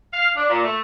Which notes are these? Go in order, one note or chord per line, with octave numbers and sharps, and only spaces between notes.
F5
D4
A#2
A3